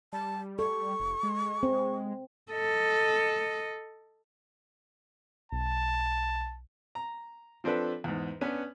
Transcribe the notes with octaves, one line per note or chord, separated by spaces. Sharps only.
G3 A5
A4 C#6
F1
G#3
C4
A4 D#5
B1 A5
A#5
F3 C4 D4 A4 B4
E2 G#2
B3 C#4 D4 B4